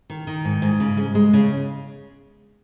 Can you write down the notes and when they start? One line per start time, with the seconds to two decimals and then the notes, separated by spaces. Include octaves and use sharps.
0.10 D#3
0.27 D#3
0.45 G#2
0.62 G#2
0.80 C#3
0.97 G#3
1.15 G#3
1.33 C#3